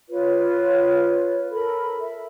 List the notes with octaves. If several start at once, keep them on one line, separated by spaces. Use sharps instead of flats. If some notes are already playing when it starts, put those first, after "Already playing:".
F4 B4 C#5
A4 A#4 B5
E5